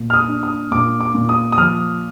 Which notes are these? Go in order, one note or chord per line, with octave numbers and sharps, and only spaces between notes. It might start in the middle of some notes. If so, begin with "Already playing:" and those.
Already playing: A#2
F6
D#6
D4
D#6
A#2 D6
D6
A#2
D#6
D#6
F3 F6